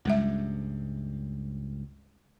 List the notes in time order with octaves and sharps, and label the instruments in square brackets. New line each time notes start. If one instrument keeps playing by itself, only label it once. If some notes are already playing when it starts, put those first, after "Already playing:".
[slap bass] C#2 G2 [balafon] G3 G#3 E5